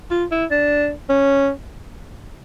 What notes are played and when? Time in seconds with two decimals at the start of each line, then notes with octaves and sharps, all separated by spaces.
0.11 F4
0.32 E4
0.51 D4
1.09 C#4